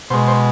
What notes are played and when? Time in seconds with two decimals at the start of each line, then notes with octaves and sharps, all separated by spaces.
0.10 B2 C5
0.13 G#3
0.28 C5